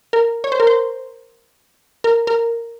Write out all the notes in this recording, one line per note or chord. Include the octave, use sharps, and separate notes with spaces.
A#4
C#5
C5
A#4
C5
A#4
A#4